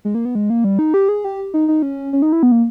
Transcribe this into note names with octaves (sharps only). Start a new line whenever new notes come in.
G#3
A#3
B3
G#3
A#3
G3
D#4
G4
G#4
G4
D#4
D#4
C#4
C#4
D#4
E4
B3
A#3